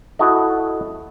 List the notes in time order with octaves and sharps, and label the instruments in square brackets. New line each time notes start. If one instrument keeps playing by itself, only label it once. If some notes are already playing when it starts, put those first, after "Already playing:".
[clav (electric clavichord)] E4 F#4 A4 D#5